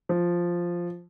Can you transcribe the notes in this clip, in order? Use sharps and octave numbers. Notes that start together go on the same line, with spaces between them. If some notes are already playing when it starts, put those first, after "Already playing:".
F3